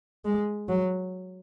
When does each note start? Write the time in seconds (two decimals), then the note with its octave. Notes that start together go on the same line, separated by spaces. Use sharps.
0.25 G#3
0.69 F#3